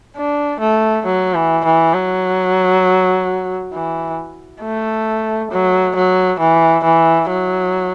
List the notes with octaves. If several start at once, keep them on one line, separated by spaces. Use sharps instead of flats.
D4
A3
F#3
E3
E3
F#3
E3
A3
F#3
F#3
E3
E3
F#3